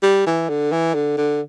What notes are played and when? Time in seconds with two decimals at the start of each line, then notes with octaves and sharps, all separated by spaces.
0.02 G3
0.26 E3
0.49 D3
0.72 E3
0.94 D3
1.17 D3